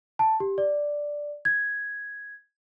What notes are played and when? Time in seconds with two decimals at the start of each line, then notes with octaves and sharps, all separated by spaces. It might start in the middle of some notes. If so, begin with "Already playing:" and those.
0.19 A5
0.40 G4
0.58 D5
1.45 G#6